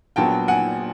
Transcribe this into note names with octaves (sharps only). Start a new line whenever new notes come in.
A#1 A#2 F#3 B3 G5 A5
F#5 G#5